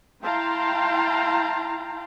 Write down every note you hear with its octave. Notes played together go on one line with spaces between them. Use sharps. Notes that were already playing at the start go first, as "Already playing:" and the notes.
E4 F5 G5 A5 A#5 C6